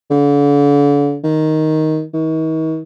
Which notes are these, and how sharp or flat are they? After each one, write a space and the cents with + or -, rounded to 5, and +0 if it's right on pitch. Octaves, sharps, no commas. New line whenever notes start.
D3 -40
D#3 +5
D#3 +40